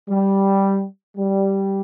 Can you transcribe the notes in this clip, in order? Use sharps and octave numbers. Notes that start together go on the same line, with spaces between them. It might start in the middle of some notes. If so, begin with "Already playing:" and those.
G3
G3